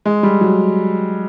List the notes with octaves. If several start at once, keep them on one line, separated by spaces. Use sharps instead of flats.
G#3
G3
F#3